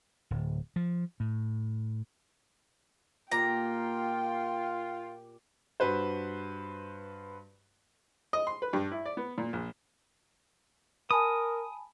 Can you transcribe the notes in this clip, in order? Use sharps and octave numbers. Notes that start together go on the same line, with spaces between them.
D1
F3
A2
A#2 F4 G4 G5 A#5
G2 F#4 B4 C5
D#5
C6
B4
G2
E4
D5
B3
A#2
A#1
A#4 G#5 A5 B5 D#6